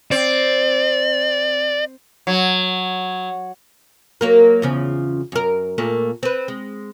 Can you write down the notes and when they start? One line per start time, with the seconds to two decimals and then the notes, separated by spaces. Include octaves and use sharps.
0.11 C4 D5
2.27 F#3
4.21 F#3 A#3 A#4
4.62 E2 C#3 F3
5.32 F#2 A#4
5.78 A#2 A3 A#3
6.23 C4 B4
6.48 G#3